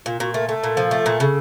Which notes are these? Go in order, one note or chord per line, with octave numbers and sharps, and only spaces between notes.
A#2 F4
A#2 F#4
A3 A#4
A3 A4
A#2
F3
A3
A#2
C#3 A4